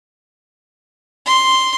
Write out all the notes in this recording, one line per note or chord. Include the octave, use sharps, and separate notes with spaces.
C6